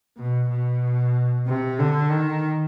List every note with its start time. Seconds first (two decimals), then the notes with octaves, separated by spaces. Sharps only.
0.17 B2
0.50 B2
1.47 C3
1.79 D3
2.11 D#3